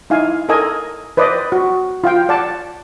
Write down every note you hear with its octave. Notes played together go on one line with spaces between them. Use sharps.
D#4 E4 F5 G#5
A4 A#4 D#5 G#5
B4 C5 D5 D#5
F#4
F4 F5 G5
D5 F#5 A5